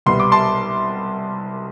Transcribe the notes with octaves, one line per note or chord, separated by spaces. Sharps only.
C2 B2 G3 B3 C6
D6
A5 C6